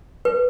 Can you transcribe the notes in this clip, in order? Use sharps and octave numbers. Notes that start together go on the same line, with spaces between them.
B4